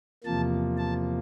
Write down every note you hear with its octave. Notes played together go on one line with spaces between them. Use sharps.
E2 C3 F3 A#3 A5
A5